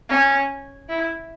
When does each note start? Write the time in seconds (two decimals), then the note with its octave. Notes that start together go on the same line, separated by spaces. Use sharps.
0.09 C#4
0.89 E4